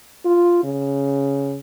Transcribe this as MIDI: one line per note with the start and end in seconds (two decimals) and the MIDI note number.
0.25 0.61 65
0.64 1.58 49